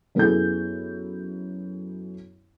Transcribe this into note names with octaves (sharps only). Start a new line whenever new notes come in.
F#2 B3 E4 G#4 A4 G6